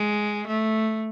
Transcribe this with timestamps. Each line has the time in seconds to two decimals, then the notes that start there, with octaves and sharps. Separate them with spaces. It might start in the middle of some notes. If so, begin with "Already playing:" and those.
Already playing: G#3
0.47 A3